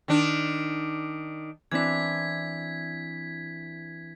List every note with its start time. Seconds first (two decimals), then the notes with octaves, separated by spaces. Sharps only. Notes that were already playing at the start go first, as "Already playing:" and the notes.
0.08 D#3 D4
1.71 E3 C4 D4 G#6 B6